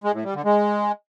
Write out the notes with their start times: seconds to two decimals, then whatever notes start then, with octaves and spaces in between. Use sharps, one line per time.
0.04 G#3
0.14 A2
0.24 G3
0.35 D3
0.45 G#3